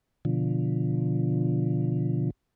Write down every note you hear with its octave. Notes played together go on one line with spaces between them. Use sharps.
B2 D3 F3